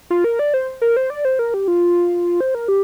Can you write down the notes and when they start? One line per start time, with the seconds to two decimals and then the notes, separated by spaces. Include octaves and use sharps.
0.10 F4
0.24 A#4
0.39 D5
0.54 C5
0.82 A#4
0.97 C5
1.10 D5
1.25 C5
1.39 A#4
1.54 G4
1.68 F4
2.41 C5
2.55 A#4
2.68 G4